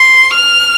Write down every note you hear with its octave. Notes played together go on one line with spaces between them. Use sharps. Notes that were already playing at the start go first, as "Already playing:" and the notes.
Already playing: C6
F6